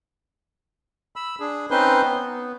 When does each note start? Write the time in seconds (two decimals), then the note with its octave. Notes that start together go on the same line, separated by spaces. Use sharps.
1.16 B5 E6
1.40 D4 G#4
1.71 C4 C#4 D#4 B4 C5 C6
2.04 B3